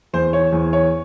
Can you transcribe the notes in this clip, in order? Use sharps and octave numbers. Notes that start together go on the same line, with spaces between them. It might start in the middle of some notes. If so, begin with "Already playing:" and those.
E2 C5
C#5
E2
C#5